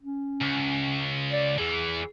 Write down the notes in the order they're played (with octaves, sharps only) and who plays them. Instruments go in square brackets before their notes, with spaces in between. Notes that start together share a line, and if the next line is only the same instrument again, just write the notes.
[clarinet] C#4
[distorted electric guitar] C#2
[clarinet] D5
[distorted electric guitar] E2 E3 [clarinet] G#4